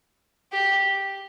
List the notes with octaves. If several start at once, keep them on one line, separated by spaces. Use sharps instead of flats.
G4